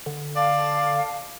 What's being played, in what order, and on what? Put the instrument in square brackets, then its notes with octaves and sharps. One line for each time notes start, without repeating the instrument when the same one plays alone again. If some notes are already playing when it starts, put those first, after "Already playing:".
[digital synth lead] D3
[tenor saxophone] D5 [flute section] F5 A5